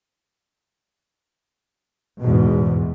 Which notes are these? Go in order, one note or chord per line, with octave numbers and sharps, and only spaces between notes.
E2 G#2 B2